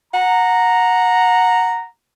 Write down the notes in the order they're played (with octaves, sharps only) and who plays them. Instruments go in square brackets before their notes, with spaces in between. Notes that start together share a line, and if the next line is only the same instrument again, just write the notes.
[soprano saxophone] F#5 [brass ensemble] A#5